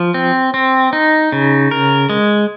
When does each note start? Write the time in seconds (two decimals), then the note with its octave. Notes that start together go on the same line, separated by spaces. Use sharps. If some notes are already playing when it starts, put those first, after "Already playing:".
Already playing: F3
0.14 C4
0.54 C4
0.93 D#4
1.32 C#3
1.71 A#4
2.10 G#3